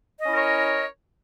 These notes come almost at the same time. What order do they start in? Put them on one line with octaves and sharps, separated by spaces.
D#5 C#4 E4 A#4 C#5